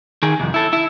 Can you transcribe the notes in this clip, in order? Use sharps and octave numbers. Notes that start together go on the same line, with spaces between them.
D#3 G#4
C2 F2
E4 A4
E4